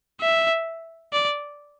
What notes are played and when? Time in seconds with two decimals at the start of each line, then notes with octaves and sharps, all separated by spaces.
0.21 E5
1.13 D5